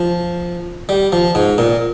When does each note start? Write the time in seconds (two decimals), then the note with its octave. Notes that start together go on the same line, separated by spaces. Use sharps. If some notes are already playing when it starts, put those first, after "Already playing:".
Already playing: F3
0.89 G3
1.12 F3
1.35 G#2
1.58 A#2